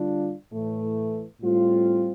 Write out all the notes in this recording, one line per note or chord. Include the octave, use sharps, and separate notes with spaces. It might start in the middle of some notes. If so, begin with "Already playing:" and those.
Already playing: D3 G3 D4 F4
A2 E3 A3
A2 G3 C4 F4